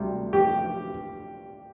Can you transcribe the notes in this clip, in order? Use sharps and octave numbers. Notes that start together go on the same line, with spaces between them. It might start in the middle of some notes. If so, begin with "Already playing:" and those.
Already playing: D2 C3 G3
G4